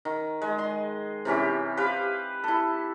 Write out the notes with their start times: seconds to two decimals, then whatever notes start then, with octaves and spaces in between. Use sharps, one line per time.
0.05 D#3
0.42 G#3
0.58 D#5 C6
1.25 C3 E3 C#4 G4
1.77 G4 B4 C5 F5
2.44 E4 A4